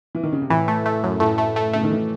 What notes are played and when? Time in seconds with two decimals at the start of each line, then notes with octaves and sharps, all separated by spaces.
0.15 E3
0.23 D#3
0.32 C#3
0.41 C3
0.50 A2 E3
0.68 A3
0.86 A3
1.03 F#2
1.20 A2 A3
1.38 A3
1.56 A3
1.73 C#3 A3
1.83 D#3
1.91 E3